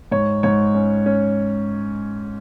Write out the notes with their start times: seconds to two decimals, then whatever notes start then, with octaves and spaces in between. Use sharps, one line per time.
0.11 G#2 C#5
0.43 G#2 C#5
0.75 C#4
1.06 C#4